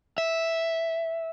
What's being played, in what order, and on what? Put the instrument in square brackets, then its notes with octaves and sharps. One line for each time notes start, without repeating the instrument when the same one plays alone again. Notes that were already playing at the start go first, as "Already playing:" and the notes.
[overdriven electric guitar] E5